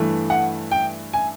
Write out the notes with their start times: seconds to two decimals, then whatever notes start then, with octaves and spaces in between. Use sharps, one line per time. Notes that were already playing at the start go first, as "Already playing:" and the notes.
Already playing: G2 E3 A3
0.30 F#5
0.71 G5
1.13 G#5